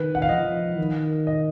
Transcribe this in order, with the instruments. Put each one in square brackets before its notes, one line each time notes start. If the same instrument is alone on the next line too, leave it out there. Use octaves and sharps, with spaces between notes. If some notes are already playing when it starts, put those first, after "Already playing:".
Already playing: [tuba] D#3 [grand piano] B4
[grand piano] F#5
F5
[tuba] F3 [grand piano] D#5
[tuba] D#3
[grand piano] D#5